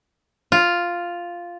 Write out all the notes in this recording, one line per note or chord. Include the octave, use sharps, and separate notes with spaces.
F4